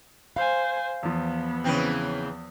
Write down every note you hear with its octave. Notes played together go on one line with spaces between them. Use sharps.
C5 F5 G#5
E2 F3 B3
C#3 E3 C4